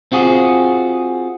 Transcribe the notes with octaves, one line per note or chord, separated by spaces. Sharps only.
C4 F4 F#4 G#4